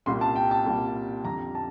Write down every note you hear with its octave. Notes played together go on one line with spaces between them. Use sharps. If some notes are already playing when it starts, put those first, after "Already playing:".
C2 A#2 G3 C6
A5
G5
A5
C2 A#2 G3
F2 D3 G3 A#5
A5